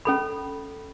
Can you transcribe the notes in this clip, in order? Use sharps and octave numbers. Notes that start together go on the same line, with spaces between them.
C#4 A4 B5